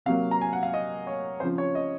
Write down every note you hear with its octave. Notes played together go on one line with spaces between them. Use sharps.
C3 F#3 A#3 F5
A#5
G#5
F#5
F5
D#5
C#5
C#3 F3 C4 C5
C#5
D#5